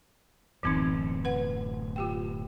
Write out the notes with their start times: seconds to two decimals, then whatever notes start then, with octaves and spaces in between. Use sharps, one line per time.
0.63 D1 F#2 B2 E3 C4 D#4
1.25 B4 F#5
1.96 F4 G4 G5